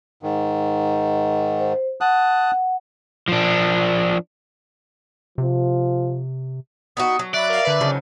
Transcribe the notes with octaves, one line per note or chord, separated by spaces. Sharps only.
G#2 D#3
C5
F#5 A5 D#6 F#6
F3 D4
C3 F3
B3 D#4 F#4 D#6
F#3
D5 E5 B5 F#6
A#4 F5
D3 B4
C#3 F3 F#3 D#4